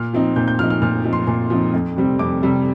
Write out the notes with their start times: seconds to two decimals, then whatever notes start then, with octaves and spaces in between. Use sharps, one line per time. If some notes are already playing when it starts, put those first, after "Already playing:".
Already playing: A#2 F6
0.13 F3 C4 D#4
0.36 A#2 G6
0.48 G6
0.59 F3 C4 D#4 F6
0.70 F6
0.82 A#2 F6
1.05 F3 C4 D#4
1.13 C6
1.27 A#2
1.50 F3 C4 D#4
1.73 F2
1.96 C3 G3 C4
2.19 F2 D6
2.42 C3 G3 C4